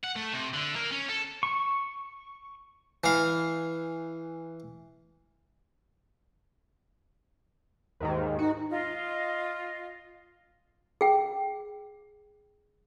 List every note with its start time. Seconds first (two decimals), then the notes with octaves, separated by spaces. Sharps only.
0.04 F#5
0.16 A3
0.33 C3
0.54 D3
0.76 A#3
0.92 C#4
1.09 A4
1.43 C#6
3.04 E3 F5
8.00 D#2 G#2 D#3
8.39 D#4 F#4
8.70 F4 D#5
11.01 G#4 G5